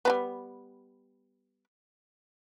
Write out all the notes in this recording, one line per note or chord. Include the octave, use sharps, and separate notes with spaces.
G3 G#3 B3